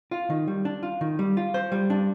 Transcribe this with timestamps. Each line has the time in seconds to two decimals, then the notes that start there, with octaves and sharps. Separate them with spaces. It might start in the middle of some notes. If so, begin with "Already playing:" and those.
0.11 F4
0.30 D#3
0.48 G3
0.65 D4
0.83 F4
1.01 D#3
1.19 G3
1.37 F4
1.54 C5
1.72 G3
1.90 D4